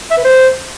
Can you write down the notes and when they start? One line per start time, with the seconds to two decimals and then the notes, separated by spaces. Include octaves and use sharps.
0.11 E5
0.18 B4
0.24 C5